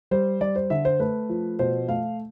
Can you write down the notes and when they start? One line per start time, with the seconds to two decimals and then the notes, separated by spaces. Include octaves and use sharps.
0.11 G3 C5
0.41 G3 D5
0.56 C5
0.70 D3 E5
0.85 C5
1.00 A3 B4
1.29 F3
1.59 B2 C5
1.88 A3 F5